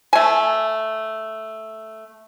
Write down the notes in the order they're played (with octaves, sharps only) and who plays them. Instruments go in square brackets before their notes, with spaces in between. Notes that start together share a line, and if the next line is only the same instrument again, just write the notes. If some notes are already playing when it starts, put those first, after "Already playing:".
[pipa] A3 G#5